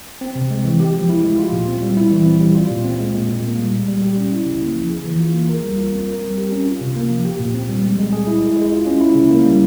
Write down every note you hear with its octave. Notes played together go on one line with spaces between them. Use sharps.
C4
C3
G#3
E3
G4
F3
E4
G#3
F4
A#2
C4
G3
E4
E3
C4
G3
F4
A#2
C4
G#3
A#2
A#2
A#3
G3
G3
G3
G4
C#4
E4
C#3
A#3
F3
G#4
E3
F4
A#3
A#4
G3
F4
C4
A#4
G3
G4
C#4
F4
C3
A#3
F3
G4
A#2
C4
G3
G#3
G#3
G#4
E4
G#3
G#3
F4
C#4
E4
C#3
A#3
G3